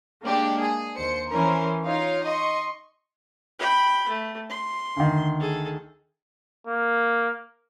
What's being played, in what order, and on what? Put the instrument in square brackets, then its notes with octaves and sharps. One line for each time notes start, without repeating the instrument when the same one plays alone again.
[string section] G#3 A#3 D4 G4
G#4
D#2 C5 C#7
E3 C#4 A#4 C5
D#4 F4 C#5 F5
D#5 C6 C#6
[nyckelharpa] G5 B5
A3
C6
[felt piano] D2 D#3
[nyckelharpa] G#4 A4
[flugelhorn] A#3